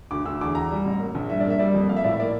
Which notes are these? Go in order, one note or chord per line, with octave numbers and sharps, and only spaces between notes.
D2 D6
D2 E6
E2 D6
E2 A#5
G3
A1
A#3
A#1
G2 E5
D5
A#3
E5
G3 D5
F2
A#3 F5
E5
A2 D5
E5
A#3 D5